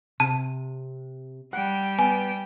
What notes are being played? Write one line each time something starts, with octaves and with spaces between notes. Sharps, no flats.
C3 A5
G3 F#5 G5
B3 G#5